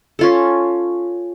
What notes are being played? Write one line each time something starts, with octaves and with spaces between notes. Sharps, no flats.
C#4 F4 A4